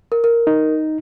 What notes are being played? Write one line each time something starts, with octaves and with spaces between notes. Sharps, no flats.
A#4
A#4
D#4